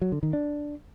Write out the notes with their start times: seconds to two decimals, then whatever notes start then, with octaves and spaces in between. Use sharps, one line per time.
0.01 F#3
0.12 D3
0.23 D#3
0.33 D4